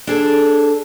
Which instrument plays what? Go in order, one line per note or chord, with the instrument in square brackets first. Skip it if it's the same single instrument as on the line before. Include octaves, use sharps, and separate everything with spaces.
[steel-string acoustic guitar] D4 G#4 A4